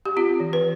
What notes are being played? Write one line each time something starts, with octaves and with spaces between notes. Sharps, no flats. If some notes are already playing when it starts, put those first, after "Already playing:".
G4
C4 F4
E3
B4